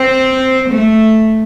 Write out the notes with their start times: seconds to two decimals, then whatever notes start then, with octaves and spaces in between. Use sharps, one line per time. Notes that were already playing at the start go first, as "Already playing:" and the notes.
Already playing: C4
0.69 A3